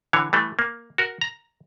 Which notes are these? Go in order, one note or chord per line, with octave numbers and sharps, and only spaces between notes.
D3 E3 C#5
E3 G3 A3
A#3
F#4 A#4
A#5